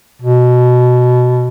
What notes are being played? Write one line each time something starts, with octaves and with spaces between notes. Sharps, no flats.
B2